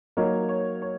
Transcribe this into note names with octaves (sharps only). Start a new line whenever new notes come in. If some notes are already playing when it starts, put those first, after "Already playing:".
F#3 A#3 D#4 C#5
C#5
C#5